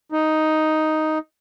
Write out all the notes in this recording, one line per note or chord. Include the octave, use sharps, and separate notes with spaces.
D#4